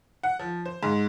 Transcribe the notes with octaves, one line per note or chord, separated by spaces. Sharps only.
F#5
F3
C5
G#2